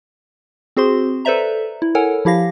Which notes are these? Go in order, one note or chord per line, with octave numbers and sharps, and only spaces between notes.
C4 F#4 G#4 C5 C6
A4 B4 C5 D5 E5 A#5
E4
A4 A#4 C#5 F#5 G#5
F3 E4 G4 F5 A#6